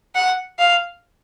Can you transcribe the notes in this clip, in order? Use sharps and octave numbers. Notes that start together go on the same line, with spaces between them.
F#5
F5